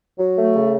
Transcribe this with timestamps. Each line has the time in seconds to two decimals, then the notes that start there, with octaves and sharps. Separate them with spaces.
0.18 F#3
0.37 A3
0.55 C#3